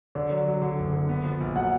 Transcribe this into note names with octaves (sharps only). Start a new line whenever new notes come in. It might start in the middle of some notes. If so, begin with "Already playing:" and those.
D3 D5
F#3
F#3
D3
F#1
D3
B3
F3
A#1
F#3 F#5